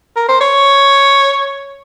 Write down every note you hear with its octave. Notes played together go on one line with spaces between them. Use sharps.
A#4
C5
C#5